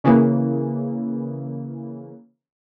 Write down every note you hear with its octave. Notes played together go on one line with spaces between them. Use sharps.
C#3 E3 A#3